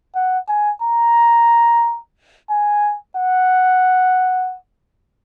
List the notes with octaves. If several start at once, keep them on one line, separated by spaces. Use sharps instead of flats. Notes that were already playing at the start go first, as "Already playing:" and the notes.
F#5
G#5
A#5
G#5
F#5